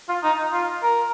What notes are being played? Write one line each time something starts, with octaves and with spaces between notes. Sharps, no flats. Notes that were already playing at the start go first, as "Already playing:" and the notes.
F4
D#4
F4
A#4